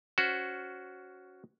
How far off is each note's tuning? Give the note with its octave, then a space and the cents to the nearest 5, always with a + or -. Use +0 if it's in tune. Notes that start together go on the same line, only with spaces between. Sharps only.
C#4 +15 F#4 +0 C5 +0